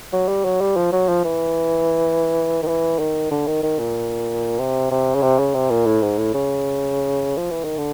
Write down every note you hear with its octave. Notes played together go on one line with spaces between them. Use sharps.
F#3
G3
F#3
G3
F3
F#3
F3
E3
D#3
E3
D#3
D3
D#3
D#3
A#2
C3
C3
C#3
C3
C#3
C3
A#2
A2
G#2
A2
C#3
F3
E3
D#3
D3